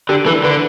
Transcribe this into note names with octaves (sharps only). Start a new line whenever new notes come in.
D3 G4
E3 A4
D3 B4